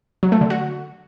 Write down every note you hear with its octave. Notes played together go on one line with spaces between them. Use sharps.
F#3
A3
D3
F#4